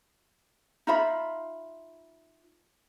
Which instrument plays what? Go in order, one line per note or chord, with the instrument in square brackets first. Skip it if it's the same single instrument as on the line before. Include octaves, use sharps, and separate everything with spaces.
[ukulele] D#4 F4 E5 B5